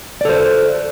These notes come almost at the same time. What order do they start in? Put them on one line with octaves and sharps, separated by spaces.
D5 A4 C5